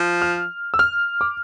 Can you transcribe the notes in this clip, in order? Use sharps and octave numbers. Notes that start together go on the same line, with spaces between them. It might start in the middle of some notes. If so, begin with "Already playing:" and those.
Already playing: F3
F6
E6
F6
D6